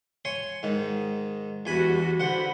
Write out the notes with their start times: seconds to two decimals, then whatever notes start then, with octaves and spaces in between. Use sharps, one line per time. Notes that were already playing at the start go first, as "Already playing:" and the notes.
0.25 C#5 G#5 C6
0.63 G#2 D#3
1.66 E2 G3 F#4 G#5 B5
2.20 D3 C5 F#5 B5